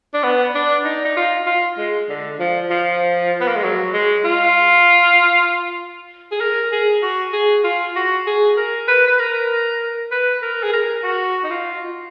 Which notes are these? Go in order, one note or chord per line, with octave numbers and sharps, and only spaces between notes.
D4
B3
D4
D#4
D#4
F4
F4
G#3
D3
F3
F3
B3
A#3
G#3
F#3
G#3
F4
G#4
A#4
G#4
F#4
G#4
F4
F#4
G#4
A#4
B4
B4
A#4
B4
A#4
G#4
A#4
F#4
D#4
F4